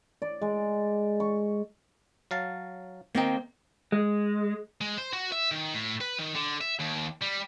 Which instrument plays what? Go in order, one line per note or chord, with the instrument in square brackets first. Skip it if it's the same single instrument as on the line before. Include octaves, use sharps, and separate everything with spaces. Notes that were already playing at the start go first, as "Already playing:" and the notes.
[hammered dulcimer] D5
G#3
C#6
[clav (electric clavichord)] F#3 F5 A5
[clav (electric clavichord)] D#3 D#4 [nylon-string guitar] A#3 C4 G5
[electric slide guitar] G#3
[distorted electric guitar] G#3
C5
F#4
E5
D#3
A2
B4
D#3
D3
E5
D#2
G3